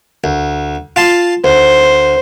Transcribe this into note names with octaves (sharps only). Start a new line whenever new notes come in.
D2
F4 A5 C6
D2 C5